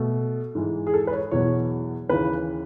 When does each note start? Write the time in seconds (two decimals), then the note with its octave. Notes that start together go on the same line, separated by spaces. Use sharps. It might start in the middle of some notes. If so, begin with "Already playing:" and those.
Already playing: B2 A3
0.55 G#2 E3 G#3
0.87 G#4
0.94 A4
1.07 B4
1.13 C#5
1.31 E2 B2 F#3 C#5
2.09 D#2 C#3 E3 B4